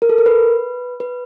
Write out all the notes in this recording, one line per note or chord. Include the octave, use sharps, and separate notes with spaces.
A#4
A4
A#4
B4
B4